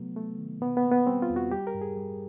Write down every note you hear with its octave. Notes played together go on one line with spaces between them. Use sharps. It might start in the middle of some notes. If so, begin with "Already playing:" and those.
Already playing: C3 F#3 A3 B3
A3
D#3
B2 B3
B3
A#3
B3
G3 C4
F4
E2
F#4
G3 G4
A#4
G2
G#4
G3